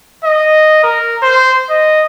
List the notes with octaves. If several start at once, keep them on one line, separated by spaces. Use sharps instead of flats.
D#5
A#4
C5
D#5